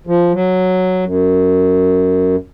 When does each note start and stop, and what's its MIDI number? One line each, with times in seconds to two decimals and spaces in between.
0.07 0.32 53
0.33 1.04 54
1.05 2.36 42